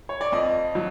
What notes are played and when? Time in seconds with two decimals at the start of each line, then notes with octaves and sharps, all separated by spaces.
0.09 C#5
0.21 D5
0.32 F2 D#5
0.75 F#3